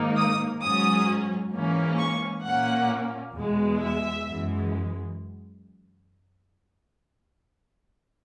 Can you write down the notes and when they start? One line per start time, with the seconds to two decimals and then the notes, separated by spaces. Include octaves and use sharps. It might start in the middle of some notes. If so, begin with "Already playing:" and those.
Already playing: G#2 D#3 A#3 D#4
0.16 D#6
0.61 G#2 F#3 C#4 D#6
1.53 G#2 E3 A#3 C#4
1.99 C#6
2.44 A#2 A#3 C#4 F#5
3.35 E2 B2 G#3
3.80 E5
4.26 F#2 E3 G#3